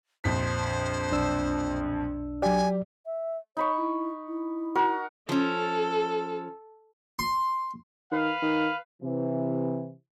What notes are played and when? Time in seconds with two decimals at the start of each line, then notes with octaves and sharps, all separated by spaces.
0.24 A#1 F2 C5 B6
1.12 B1 D4 E6
2.42 F#3 G4 D5 G#5
3.06 E5
3.57 D#4 C#5 B5 C#6
3.77 E4
4.28 E4
4.75 F#4 A#4 F#5
5.29 F3 C#4 A4
7.19 C6
8.11 D#3 B4 F5
8.42 D#3
9.02 C3 E3